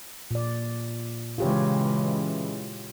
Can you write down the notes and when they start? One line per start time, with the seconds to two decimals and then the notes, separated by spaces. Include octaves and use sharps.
0.31 A#2 D5
1.38 C#3 E3 G#3 F4 G4 C#5